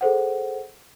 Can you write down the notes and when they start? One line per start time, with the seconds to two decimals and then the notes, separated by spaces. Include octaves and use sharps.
0.01 G#4 A4 C5 F#5